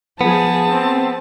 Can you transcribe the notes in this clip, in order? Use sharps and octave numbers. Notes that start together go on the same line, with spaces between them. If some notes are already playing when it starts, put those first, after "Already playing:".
F3 B3 G#4 A5
C4